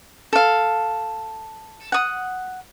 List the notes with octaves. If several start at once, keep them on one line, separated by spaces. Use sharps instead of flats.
A4 F5
F#5 D#6